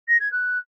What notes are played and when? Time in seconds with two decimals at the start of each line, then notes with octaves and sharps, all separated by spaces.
0.08 A#6
0.20 G#6
0.32 F#6